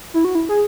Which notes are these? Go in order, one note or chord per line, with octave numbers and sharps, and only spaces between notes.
E4
F#4
E4
G#4